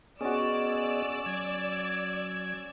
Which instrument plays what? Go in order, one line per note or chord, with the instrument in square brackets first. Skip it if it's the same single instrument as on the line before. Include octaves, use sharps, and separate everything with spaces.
[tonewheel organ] B3 G#4 D#5 [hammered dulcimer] C#4 F#4 [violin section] D5 E6
[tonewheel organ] F#3 G#6